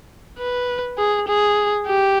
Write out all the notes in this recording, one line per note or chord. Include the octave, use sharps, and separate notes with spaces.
B4
G#4
G#4
G4